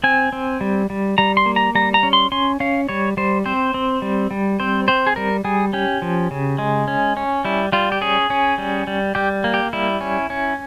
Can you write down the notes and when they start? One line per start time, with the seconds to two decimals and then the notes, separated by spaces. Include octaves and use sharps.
0.04 C4 G#5
0.33 C4
0.61 G3
0.90 G3
1.18 G3 A#5
1.37 C6
1.46 A#3
1.56 A#5
1.75 G3 A#5
1.94 A#5
2.03 C#4
2.13 C6
2.32 C#4 C6
2.60 C#4 F5
2.89 G3 C#5
3.17 G3 C5
3.46 C4 C5
3.74 C4
4.02 G3
4.31 G3
4.60 C4 C5
4.88 C4 C5
5.07 G#4
5.16 G3 A#4
5.44 G3 G#4
5.73 C#4 G4
6.02 F3
6.31 C#3
6.58 G#3
6.88 C#4
7.17 C#4
7.45 G3 E4
7.72 G3 F4
7.92 G4
8.01 C#4 G#4
8.30 C#4
8.58 G3
8.87 G3
9.15 G3 G4
9.44 A#3
9.54 G4
9.73 G3 E4
10.01 C#4
10.30 C#4